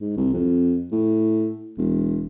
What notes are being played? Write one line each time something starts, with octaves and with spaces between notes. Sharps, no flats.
G#2
C2
F2
A2
E1